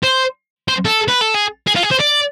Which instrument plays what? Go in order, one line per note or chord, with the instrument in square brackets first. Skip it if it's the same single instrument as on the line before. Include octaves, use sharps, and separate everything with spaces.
[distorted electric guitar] C5
C5
A4
B4
A4
G#4
G#4
F4
G#4
C5
D5